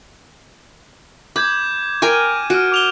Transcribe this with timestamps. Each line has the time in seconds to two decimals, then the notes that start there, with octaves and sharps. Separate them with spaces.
1.36 B5 D6 G6 G#6
2.02 A#4 G5 G#5 C#6 G#6 D#7
2.50 F#4 F6 D7
2.72 D6 F7 G7